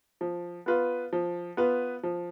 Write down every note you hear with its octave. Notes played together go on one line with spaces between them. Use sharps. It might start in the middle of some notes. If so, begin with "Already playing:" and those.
F3
B3 F4 B4
F3
B3 F4 B4
F3